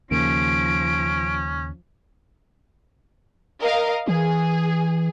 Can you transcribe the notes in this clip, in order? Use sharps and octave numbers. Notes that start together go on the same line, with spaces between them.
D#2 C#3 F3 A#3 C#4 D7
A#4 D#5 F5
E3 G#4